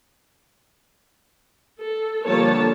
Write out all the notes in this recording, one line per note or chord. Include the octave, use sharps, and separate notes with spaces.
A4
D3 F3 G3 A#3 C#5 A5